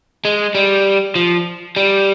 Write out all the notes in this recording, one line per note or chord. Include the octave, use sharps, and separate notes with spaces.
G#3
G3
F3
G3